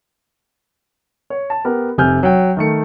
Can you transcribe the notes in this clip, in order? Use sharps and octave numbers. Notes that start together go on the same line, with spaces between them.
C#5
A5
B3 G4 A#4
F1 C3 G#5 F6 G6
F#3 G5
D#3 A3 C#7